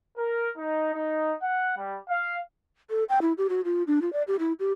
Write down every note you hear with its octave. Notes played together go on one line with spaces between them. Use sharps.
A#4
D#4
D#4
F#5
G3
F5
A4
G5
E4
G4
F#4
F4
D4
F4
D5
G4
E4
G4